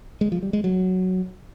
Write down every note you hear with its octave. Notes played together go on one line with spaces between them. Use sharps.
G#3
F3
G3
G#3
F#3